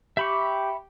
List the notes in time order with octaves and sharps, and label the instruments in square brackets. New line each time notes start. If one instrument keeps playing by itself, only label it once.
[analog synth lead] G4 [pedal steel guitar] E5 B5 C#6